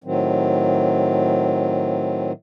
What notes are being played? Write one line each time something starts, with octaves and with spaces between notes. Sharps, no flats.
A2 D#3 F#3 C4